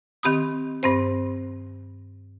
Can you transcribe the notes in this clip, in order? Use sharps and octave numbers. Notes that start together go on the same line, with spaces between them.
D#3 C4 G4 B5 D#6
G2 C4 C5